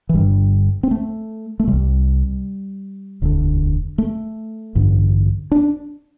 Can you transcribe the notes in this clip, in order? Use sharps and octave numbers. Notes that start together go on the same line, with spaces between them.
E3
G1 G2 D3 G3
C4
A3
A3
C3 G3
C2
E1 D2 D3
A3
A1 G2 D3
D4